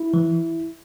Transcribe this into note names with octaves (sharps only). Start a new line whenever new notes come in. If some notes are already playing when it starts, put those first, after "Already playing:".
Already playing: E4
E3